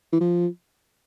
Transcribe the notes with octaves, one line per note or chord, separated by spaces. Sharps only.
E3
F3